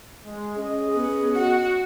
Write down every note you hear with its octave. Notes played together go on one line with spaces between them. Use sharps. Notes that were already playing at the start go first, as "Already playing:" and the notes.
G#3
C#4 G#4 D#5
B3 G#4
F#4 F#5